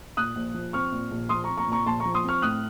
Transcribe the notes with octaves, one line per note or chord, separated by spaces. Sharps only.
A#2 D#6 F#6
A#1
F3
C4 C#6 F6
A#2
A#1
F3 C6 D#6
C4 A#5 C#6
A#5 C#6
A#2 A#5 C#6
A#1 A5 C6
A#5 C#6
F3
C6 D#6
C4 C#6 F6
A2 D#6 F#6